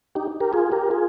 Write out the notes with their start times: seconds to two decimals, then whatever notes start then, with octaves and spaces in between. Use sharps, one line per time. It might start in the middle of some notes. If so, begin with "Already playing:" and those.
0.15 D#4 G4
0.40 G4 A#4
0.53 F4 G#4
0.72 G4 A#4
0.90 F4 G#4